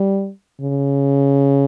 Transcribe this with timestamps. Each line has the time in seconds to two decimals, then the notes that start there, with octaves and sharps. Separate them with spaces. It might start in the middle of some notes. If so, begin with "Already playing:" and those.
Already playing: G3
0.61 C#3